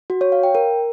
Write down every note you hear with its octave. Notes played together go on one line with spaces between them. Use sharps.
F#4
C#5
F5
G5
A#4